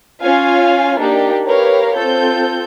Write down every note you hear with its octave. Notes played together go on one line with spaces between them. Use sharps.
C#4 F4 F5 G#5
A#3 D4 D#4 G4
G4 A#4 B4 C#5 F5
C4 F4 A4 G6